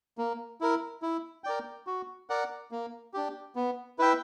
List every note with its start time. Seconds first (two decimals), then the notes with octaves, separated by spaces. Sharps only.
0.18 A#3
0.61 E4 A#4
1.02 E4
1.44 A#4 D5 G5
1.87 F#4
2.30 A#4 D5 F#5
2.71 A#3
3.14 D4 G4
3.56 B3
3.99 E4 B4 E5 G5